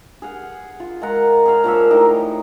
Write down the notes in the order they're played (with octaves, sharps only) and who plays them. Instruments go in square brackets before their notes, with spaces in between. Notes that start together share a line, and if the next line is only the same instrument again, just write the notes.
[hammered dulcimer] G#4 F5 F#5
F4
G#3 F4 A#4 F#5
G#4 C#5 F5 F#5
A#2 F3 C#5 E5
A2 D#4 D#5 G5